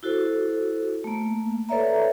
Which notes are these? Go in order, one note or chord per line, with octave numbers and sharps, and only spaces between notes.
E4 F#4 A4 C5
A3 A#3
A4 B4 C#5 D5 E5 A#5